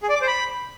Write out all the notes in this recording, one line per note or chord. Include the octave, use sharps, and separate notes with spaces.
G#4
D5
D6
C5
B5